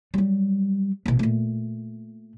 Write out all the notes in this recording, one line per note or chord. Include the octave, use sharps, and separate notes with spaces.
F#3 G3
A1 B2
A#2 A3